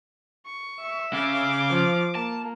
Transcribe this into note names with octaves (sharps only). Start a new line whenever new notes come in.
C#6
E5
C#3 C#4 F5 D6
F3
A#3 A5